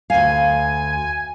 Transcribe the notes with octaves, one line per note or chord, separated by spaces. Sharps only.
D2 F5 G#5